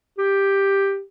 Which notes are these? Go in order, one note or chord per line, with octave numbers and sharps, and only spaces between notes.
G4